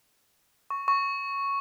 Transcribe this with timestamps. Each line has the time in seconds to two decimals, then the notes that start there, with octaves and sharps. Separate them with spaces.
0.70 C#6
0.88 C#6